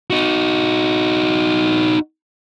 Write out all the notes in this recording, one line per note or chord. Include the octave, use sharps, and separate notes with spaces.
D#4 F#4